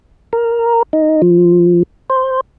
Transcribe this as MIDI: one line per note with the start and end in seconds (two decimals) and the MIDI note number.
0.33 0.83 70
0.93 1.22 63
1.22 1.83 53
2.10 2.41 72